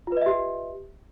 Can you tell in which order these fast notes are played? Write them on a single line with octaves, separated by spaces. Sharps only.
F4 B4 D#5 E5 G4